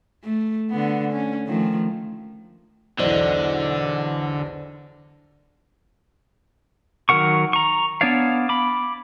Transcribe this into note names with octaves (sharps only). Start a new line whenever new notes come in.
A3
D3 B3
C#4
D#3 F3 A3
B1 E2 D3 C5 D5
D#3 F#3 A#4 F#5 C#6
A#5 C#6
B3 D4 C#5 D5 F5
B5 D6